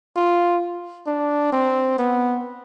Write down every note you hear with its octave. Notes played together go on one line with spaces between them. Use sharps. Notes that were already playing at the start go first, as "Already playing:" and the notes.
F4
D4
C4
B3